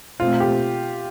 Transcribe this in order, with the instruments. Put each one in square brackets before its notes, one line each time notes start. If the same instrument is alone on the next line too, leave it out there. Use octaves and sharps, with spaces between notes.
[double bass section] B2 A3 C4 [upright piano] F4
[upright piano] G4